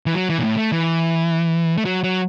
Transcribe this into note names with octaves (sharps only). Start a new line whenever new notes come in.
E3
F#3
E3
B2
A2
A3
E3
A3
F#3
F#3